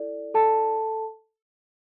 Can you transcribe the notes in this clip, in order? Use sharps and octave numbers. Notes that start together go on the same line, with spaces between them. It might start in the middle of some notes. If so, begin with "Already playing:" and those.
Already playing: E4 A4 D5
A4 A5